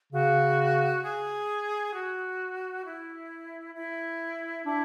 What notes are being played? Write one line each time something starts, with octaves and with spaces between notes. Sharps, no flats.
C#3 F#4
G#4
F#4
E4
E4
D4 E4